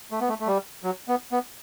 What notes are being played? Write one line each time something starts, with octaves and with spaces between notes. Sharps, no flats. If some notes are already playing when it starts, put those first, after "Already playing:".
A3
B3
A3
A3
G3
F#3
B3
B3